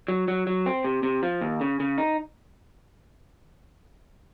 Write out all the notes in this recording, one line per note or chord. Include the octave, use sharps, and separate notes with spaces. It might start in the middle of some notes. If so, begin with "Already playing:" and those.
F#3
F#3
F#3
C4
C3
C3
F3
D#2
C#3
C#3
D#4